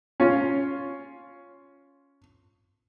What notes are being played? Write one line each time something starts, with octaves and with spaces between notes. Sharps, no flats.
C#4 F4